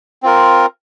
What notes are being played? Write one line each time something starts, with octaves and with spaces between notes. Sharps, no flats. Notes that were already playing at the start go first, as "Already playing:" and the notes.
C4 F4 A#4